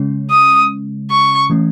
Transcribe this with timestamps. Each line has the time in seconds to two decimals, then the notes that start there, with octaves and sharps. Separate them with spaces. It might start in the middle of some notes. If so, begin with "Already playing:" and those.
Already playing: C#3 G#3 C#4
0.30 D#6
1.11 C#6
1.50 E3 A3 C#4